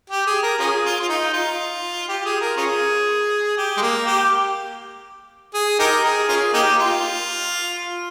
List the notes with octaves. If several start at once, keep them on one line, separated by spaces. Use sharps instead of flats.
G4
G#4
A#4
C#4 F4 G#4
F4
F4
D#4
F4
G4
G#4
A#4
C#4 F4 G#4
G4
G#3
A#3
G4
G#4
D#4 G4 A#4
G#4
C#4 F4 G#4
A#3 D#4 G4
F4